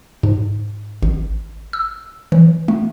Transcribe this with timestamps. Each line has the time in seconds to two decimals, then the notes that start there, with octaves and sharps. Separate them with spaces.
0.23 G#2
1.03 G#1
1.73 E6
2.32 E3
2.68 A3